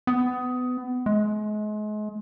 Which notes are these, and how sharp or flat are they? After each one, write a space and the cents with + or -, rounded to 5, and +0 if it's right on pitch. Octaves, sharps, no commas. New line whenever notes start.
B3 +25
G#3 +35